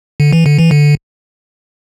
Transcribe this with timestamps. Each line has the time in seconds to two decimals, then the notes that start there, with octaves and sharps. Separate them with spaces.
0.20 D3
0.33 E3
0.46 D3
0.58 E3
0.71 D3